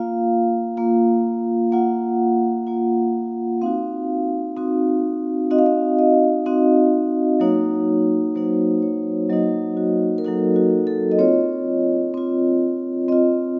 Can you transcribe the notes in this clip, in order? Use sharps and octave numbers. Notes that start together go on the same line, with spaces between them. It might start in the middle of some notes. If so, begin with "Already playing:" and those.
Already playing: A#3 F4 F5
A#3 F4
A#3 F4 F#5
A#3 F4
C4 D#4 F#4 F5
C4 D#4 F#4
C4 D#4 F#4 D#5
F5
D#5
D#5
C4 D#4 F#4
F#3 A#3 D#4 F#4 C#5
F#3 A#3 D#4 F#4 C5
C#5
F#3 A#3 D#4 F#4 D#5
F#4
A#4
F#3 A#3 D#4 F#4 A4
F#4
A4
D#5
C4 F4 C#5
C4 F4
C4 F4 D#5